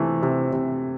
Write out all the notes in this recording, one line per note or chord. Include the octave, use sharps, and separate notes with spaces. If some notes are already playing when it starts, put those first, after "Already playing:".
Already playing: C3 E3 A3
C3
C3